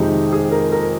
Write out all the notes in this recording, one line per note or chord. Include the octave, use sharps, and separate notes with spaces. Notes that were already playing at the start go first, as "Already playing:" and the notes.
Already playing: F2 C3 D#3 G#3 D#4 G4
G#4
A#4
A#4